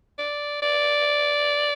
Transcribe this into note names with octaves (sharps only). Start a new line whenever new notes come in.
D5
D5